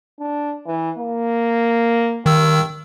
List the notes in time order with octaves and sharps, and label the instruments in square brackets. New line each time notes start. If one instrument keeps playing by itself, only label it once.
[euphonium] D4
E3
A#3
[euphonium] G2 [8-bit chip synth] D#3 E6